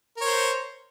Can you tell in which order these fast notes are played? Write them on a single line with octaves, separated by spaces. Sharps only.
A#4 C#5 C5